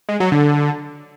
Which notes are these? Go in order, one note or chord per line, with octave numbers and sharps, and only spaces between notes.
G#3
F#3
D3